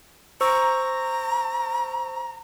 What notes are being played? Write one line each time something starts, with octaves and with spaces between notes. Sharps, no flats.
C5 A#5 C#6 E6